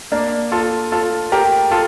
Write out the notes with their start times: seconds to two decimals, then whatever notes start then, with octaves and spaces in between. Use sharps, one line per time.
0.12 A#3 D4
0.52 F4 A4
0.92 F4 A4
1.32 G4 A#4
1.71 F4 A4